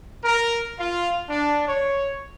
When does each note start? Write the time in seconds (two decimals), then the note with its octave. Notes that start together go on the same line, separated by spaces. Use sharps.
0.24 A#4
0.79 F4
1.30 D4
1.68 C#5